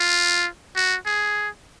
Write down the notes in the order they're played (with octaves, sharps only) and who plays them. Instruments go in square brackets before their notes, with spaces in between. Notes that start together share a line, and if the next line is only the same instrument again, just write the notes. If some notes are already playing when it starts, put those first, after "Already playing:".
Already playing: [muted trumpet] F4
F#4
G#4